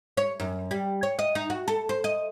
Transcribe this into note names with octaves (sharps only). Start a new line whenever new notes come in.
C#5
F#2
G3
C#5
D#5
D#4
F#4
A4
C5
D#5